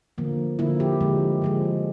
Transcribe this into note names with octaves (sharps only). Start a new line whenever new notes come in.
D3 F3 A#3
D3 F3 A#3 E4
G4
D3 F3 G#3
D3 F3 G#3